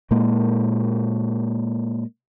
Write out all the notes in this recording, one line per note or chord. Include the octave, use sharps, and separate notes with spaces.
A#2 G#3 A#3